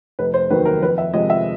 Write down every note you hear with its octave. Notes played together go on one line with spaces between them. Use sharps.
F1 B4
C5
D#2 D#3 F#3 A#3 B4
A#4
F2 B4
E5
C3 F3 G#3 D#5
E5